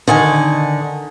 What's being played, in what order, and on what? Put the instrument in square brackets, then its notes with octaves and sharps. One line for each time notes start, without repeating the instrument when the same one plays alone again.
[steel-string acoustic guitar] D3 D#3 G#5